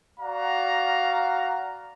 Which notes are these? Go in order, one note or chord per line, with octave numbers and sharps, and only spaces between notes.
F#4 D5 F5 F#5 A#5